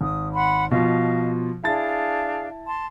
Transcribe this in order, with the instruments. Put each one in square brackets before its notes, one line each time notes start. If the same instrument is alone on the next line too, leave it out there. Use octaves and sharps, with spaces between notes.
[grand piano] G#1 [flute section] D#6
[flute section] F#5 B5 C6
[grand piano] B2 F3 F4 [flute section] D#5 F5
[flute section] D4 G#4 F5 [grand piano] E4 A5 A6
[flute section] A5 C6